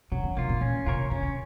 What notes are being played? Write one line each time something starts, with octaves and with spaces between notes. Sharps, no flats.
C3 F#3
C#3
C3 A#3 F4
A#2
A#2 C#4
C3 F4 A#4 C#5
C3 C#4
C#3